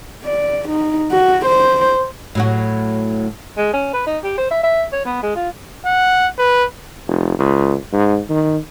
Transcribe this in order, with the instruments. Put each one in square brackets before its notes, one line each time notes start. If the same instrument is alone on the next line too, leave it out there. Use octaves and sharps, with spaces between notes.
[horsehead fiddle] D5
D#4
F#4
C5
[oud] A2 F#3 F#4
[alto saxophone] G#3
C#4
B4
D#4
G4
C5
E5
E5
C#5
B3
G#3
F4
[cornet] F#5
B4
[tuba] F1
C#2
G#2
D#3